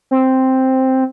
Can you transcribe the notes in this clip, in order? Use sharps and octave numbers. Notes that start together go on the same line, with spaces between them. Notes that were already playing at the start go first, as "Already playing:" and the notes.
C4